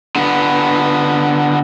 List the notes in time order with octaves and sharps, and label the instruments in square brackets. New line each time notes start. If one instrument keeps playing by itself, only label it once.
[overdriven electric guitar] D3 B3